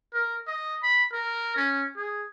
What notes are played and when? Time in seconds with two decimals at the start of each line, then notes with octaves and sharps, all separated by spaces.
0.13 A#4
0.47 D#5
0.83 B5
1.12 A#4
1.56 C#4
1.97 G#4